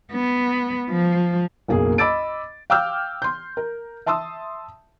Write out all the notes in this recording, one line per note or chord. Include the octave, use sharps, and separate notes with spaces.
B3
F3
F#1 B1 A#3 G#4
D#5 B5 D6 E6 A6 D7
F5 G5 D6 E6 F6 G6
C6 G6
A#4
E5 A5 C6 D#6 E6